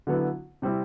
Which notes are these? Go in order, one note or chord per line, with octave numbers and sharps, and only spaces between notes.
D3 F#3 B3 E4
C3 G3 C4 E4